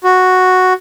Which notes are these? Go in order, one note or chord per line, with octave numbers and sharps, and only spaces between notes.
F#4